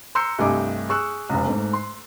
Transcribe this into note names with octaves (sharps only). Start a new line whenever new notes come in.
A#5 C6 E6 G6 C#7
C2 G2 A3 D#5 G#5 D6
G#4 C#6 E6 F#6
F1 C#2
G#2 A3
C6